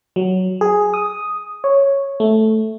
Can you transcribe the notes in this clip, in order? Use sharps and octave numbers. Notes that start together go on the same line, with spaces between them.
F#3
G#4
D#6
C#5
A3